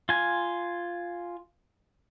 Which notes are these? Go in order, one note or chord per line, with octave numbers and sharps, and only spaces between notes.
F4 G#5